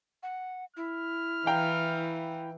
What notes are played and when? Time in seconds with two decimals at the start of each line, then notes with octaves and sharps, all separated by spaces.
0.23 F#5
0.77 E4 F6
1.46 E3 F5 G5 A#5